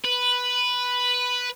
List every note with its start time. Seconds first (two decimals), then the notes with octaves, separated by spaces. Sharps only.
0.05 B4